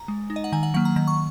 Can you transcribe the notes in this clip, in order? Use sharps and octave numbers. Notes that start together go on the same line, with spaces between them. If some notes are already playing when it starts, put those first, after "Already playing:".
Already playing: A#5
G#3
D#4
D#5
F#5
D#3 G#5
F#5
F#3 A#3 F#5
A#5
D#3 A#5
C#6